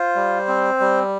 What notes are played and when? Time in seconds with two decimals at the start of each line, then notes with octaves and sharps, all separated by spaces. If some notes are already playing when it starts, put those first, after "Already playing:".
Already playing: F4 C5
0.15 G3
0.48 C4
0.80 G3